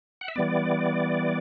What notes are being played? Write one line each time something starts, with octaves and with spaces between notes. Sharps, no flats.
F#5
E5
E3 G3 B3 D5